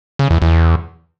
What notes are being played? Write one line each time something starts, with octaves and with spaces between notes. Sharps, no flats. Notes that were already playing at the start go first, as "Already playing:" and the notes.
C#3
E2
E2